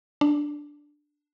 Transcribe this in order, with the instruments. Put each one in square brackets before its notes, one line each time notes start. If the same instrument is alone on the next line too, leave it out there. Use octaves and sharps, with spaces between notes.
[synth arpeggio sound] D4